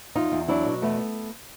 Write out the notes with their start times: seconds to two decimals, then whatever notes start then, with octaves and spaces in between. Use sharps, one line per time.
0.15 E2 D#4 F4
0.32 E2
0.48 F#3 D4 E4
0.66 B2
0.82 E2 A3 B3